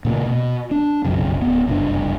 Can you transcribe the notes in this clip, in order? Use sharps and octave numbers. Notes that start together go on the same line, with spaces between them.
A#2 C#3 A3 A#3
B2
D4
F1 B1 F#2 C#3
D1 B3
F#1 C2 G2 D4